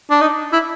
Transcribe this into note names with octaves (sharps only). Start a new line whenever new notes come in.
D4
D#4
E4